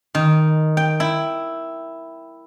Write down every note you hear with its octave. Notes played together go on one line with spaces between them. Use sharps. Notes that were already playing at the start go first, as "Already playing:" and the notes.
D#3
G5
E4